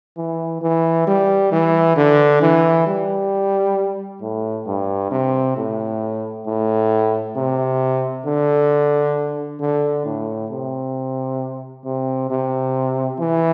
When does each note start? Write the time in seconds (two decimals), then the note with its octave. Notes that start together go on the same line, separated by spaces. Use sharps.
0.17 E3
0.62 E3
1.07 G3
1.52 E3
1.97 D3
2.42 E3
2.86 G3
4.21 A2
4.66 G2
5.11 C3
5.56 A2
6.46 A2
7.36 C3
8.25 D3
9.60 D3
10.05 A2
10.50 C3
11.85 C3
12.30 C3
13.19 E3